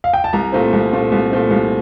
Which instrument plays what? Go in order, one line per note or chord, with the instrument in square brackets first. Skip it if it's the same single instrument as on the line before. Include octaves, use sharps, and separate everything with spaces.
[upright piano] F5
G5
A5
C2 A#5
A#2 A3 C4
C2
A#2 A3 C4
C2
A#2 A3 C4
C2